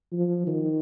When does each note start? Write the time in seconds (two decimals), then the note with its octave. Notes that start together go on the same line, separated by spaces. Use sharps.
0.13 F3
0.47 D#3